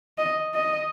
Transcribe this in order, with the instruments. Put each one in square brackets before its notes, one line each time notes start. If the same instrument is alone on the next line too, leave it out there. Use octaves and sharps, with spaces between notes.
[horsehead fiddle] D#5
D#5